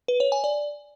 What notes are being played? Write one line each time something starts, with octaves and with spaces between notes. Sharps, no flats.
B4
C#5
G#5
D5